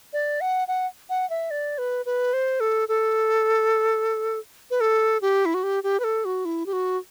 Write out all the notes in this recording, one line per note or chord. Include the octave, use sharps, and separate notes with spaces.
D5
F#5
F#5
F#5
E5
D5
B4
B4
C5
A4
A4
B4
A4
G4
E4
F#4
G4
G4
B4
A4
F#4
E4
G4
F#4